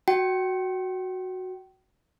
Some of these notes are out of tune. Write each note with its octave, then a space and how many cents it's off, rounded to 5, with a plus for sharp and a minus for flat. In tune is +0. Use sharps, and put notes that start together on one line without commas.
F#4 +0 G5 -35